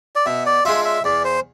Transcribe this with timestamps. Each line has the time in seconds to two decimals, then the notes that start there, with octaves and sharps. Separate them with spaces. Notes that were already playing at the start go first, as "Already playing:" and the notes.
0.16 D5
0.26 B2 E5
0.46 D5
0.65 G#3 D4 F4 E5
0.85 E5
1.04 E2 D5
1.25 C5